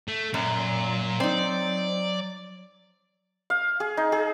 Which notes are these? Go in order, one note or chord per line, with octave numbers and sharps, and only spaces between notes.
A3
F#2 A#2 F#3 A#5
C4 D#4 D5
F5
G#4
D#4
G#4